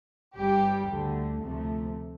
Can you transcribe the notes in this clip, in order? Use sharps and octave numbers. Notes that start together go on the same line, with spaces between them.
G1 G2 G3 G4
D2 D3 A3
D2 C3 F3 A3